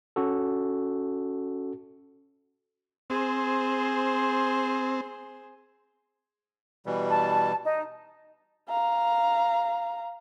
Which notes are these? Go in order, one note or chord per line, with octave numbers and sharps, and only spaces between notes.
C#4 F#4 A4
C4 G#4 C5
B2 E3 G3
A5
D#4
F5 A#5